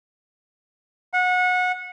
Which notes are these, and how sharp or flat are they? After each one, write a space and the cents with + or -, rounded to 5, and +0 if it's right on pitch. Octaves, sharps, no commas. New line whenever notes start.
F#5 -25